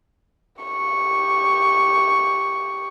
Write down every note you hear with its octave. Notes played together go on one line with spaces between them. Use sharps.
G4 C#6